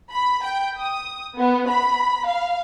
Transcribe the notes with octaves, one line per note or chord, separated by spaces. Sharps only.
B5
G5
D#6
B3
B5
F5